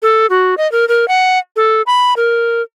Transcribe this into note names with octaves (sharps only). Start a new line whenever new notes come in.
A4
F#4
D#5
A#4
A#4
F#5
A4
B5
A#4